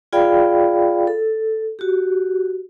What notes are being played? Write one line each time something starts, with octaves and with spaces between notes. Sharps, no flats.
F4 G#4 D5 F5 G5 B5
A4
F#4 G4